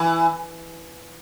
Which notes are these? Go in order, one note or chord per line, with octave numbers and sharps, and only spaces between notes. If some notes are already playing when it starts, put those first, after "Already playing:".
Already playing: E3